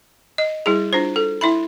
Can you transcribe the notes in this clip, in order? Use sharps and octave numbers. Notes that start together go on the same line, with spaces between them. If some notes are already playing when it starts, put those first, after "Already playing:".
D#5
G3 E4 G#4
D4 F4 C5
A4
E4 E5 B5